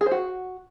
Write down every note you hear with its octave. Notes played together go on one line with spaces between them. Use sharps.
G#4
C5
F#4